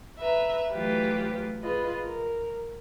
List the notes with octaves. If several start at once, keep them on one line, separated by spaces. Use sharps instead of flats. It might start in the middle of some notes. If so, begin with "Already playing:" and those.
B4 E5 A#5
E3 F#3 A3 F4 G4 B4
F4 G#4 B4 D#5
A#4